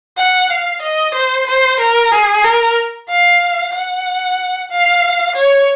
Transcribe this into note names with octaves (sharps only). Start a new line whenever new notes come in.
F#5
F5
D#5
C5
C5
A#4
G#4
A#4
F5
F#5
F5
C#5